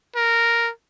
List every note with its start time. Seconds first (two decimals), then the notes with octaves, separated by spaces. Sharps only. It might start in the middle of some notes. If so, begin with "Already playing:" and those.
0.15 A#4